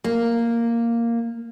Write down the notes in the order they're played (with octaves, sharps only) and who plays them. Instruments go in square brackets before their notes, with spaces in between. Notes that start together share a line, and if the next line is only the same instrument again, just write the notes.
[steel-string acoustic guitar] A#3